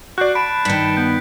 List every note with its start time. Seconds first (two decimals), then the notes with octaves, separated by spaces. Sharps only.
0.18 F#4 D5 F#6 G6 C7
0.35 A5 B5 D7
0.65 G2 D#3 B6 C#7
0.97 B3 G6